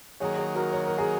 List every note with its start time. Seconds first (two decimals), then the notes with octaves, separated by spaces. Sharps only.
0.20 D#3 F#3 A#3 G#4 C#5
0.38 G#4 C#5
0.55 F#4 A#4
0.72 C#5
0.86 A#4
0.98 G#4